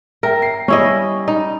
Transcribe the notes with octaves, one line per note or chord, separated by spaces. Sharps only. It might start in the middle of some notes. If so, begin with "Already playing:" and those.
A#4 E5 G5
C7
G3 C#4 E4 D#5
D#4